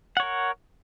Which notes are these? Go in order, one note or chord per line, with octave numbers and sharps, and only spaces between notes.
A#4 C#5 F#5